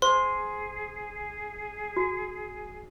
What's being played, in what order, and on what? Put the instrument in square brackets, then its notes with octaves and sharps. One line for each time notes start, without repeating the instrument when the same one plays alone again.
[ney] G#4 [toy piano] C5 [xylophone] C6
[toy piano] F#4